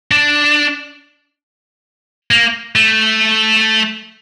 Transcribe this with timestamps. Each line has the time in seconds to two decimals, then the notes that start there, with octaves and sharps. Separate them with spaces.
0.11 D4
2.31 A#3
2.76 A3